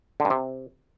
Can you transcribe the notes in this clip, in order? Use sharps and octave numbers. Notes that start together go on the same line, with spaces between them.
D3
G2
C3